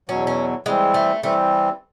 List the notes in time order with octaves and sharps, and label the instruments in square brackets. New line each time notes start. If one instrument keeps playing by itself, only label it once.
[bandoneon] E2 B2 F#3 [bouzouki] C#4
[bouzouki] C#4
[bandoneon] E3 G3 C4 [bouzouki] G#3
[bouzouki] A3
[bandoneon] E3 G3 C4 [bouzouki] A3